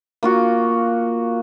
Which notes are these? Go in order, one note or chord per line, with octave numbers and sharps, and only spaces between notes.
A#3 F4 F#4